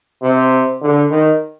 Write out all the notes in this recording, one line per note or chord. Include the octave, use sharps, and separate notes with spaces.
C3
D3
D#3